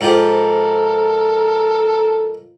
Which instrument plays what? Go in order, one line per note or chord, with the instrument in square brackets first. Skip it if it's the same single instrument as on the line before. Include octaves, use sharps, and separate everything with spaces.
[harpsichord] G#2 F3 G4 [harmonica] A4 A#4